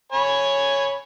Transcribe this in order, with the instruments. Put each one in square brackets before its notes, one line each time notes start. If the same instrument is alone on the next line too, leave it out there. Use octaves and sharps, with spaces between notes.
[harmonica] C#5 G#5 B5